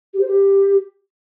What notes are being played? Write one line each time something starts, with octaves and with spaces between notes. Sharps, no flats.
G4
C5
G4